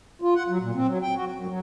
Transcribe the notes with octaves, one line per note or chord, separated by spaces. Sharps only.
F4
F#5
F#3
A#2
C4
F#3
G5
F#4
F#2
F#3